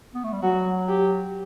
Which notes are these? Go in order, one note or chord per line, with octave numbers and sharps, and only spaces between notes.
B3
A3
G3
F#3 F#4
G4